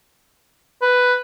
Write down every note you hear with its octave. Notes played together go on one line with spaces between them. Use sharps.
B4